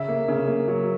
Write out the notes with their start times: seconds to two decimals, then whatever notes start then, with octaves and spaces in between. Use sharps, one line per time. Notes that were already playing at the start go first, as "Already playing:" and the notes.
Already playing: C#3 E5
0.08 A#3
0.28 C#3
0.48 A#3
0.68 F#3